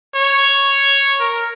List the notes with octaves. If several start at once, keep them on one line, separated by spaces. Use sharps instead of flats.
C#5
A#4